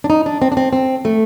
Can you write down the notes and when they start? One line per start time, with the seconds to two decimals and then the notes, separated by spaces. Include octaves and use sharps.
0.04 D4
0.10 D#4
0.26 D4
0.42 C4
0.52 D4
0.57 C4
0.73 C4
1.05 A3